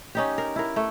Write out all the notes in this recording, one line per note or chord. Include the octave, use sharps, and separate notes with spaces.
C#4 D#4 G4
A#4
E4 A#4
A3